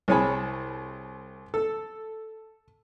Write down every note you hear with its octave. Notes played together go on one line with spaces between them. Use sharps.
C2 G#4 C#5 G#5 A5 B5
A4